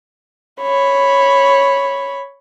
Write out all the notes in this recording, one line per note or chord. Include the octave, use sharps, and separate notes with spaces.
C#5 B5